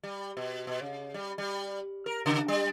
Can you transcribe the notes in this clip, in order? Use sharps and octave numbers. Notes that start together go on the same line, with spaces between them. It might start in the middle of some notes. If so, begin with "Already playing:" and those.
G3
B2
B2
C#3
G3
G3
A#4
C#3
G3